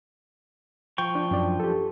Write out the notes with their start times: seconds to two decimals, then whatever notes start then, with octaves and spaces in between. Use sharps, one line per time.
0.98 F3 G5 C#6
1.15 D4
1.31 F#2 D4 D5
1.60 G4 A4